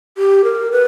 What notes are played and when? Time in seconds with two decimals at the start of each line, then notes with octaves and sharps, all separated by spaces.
0.18 G4
0.44 A#4
0.72 B4